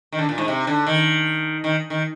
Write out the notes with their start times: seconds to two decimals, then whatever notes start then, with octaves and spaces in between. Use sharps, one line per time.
0.12 D#3
0.19 D3
0.29 A#2
0.38 G#2
0.48 C3
0.67 D3
0.86 D#3
1.64 D#3
1.90 D#3